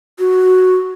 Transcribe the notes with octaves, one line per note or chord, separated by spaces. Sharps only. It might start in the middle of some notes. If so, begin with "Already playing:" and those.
F#4